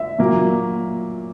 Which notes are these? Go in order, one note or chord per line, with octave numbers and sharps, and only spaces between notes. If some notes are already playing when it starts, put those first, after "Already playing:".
Already playing: E5
A#2 F#3 A#3